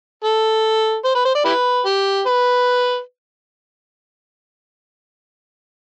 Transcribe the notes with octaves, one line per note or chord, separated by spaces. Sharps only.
A4
C5
B4
C5
D5
E4 G4 B4
G4
B4